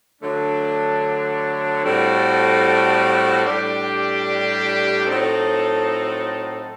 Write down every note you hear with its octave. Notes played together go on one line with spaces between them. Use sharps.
D3 F#3 A3 D4
A2 G3 C4 F#4 A4
A2 G3 D4 G4
A2 F#3 C4 D#4 A4